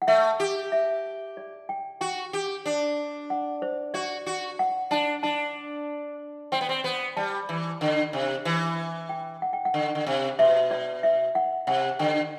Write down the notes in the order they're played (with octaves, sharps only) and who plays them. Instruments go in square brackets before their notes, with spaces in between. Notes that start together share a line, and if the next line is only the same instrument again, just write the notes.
[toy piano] F#5
[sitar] A3 [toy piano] E5
[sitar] G4
[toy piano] E5
D5
G5
[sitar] F#4 [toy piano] G5
[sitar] G4
D4
[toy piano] F#5
C5
[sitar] F#4 [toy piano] D5
[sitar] F#4
[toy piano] F#5
[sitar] D4 [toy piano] A5
[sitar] D4 [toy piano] A5
[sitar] C4 [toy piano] G5
[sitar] B3
C4
B3
[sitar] G3 [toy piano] A5
[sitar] E3
D3
C3
E3
[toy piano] G5
F#5
G5
F#5
[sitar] D3
D3
C3
[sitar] B2 [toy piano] E5
[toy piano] D5
E5
F#5
[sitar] C3 [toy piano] F#5
[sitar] D3 [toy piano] G5